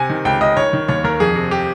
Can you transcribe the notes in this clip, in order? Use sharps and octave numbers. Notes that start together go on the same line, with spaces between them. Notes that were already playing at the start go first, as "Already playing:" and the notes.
Already playing: C3 G#5
D#3
C#2 G5
C#2 D#5
D#3 C#5
D#3
D#2 C#5
D#2 A#4
F2 G#4
C3
G4